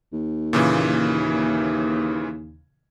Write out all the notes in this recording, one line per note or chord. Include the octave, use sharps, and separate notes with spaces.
D#2
A#2 C#3 E3